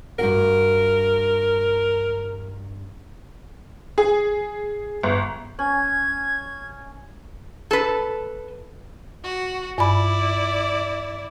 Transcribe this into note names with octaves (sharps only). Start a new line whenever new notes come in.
G2 F#4 A#4 F#5
G#4
G1
C#4 G#6
A4 B4
F#4
G2 E4 D5 B5